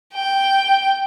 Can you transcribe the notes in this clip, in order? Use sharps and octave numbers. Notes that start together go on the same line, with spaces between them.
G5